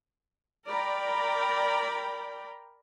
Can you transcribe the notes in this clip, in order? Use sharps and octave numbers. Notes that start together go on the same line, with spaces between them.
A#4 D5 G5 A#5 B5